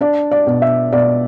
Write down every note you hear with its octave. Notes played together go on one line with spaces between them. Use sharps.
D4 D5
D5
B2
E5
B2 D5